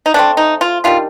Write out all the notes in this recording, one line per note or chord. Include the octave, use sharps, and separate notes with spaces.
D#4
D3 A3 C4 D4
D#4
F4
D#3 G3 D4 F4